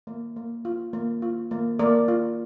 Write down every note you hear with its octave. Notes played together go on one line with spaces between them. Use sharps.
A#3
A#3
F4
A#3
F4
A#3
A#3 A#4 D5
F4